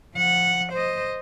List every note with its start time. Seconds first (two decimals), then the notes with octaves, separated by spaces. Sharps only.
0.15 F3 F#5
0.73 C5 D#5